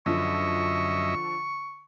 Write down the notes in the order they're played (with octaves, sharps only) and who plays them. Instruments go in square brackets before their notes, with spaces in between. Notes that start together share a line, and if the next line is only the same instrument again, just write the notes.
[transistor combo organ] F#2 D#5 E5 [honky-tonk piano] D3 F3 [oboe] C#6